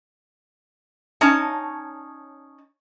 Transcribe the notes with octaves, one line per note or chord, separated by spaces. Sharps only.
C#4 D#4 A5